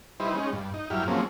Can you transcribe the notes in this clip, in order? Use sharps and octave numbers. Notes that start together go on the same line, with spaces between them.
G3 D#4 E4 B4 C5
G#3 C#4 D#4
G2
D#4
G2 F#3 E4 G4 F6
F3 F#3 G#3 A#3 C4 C#4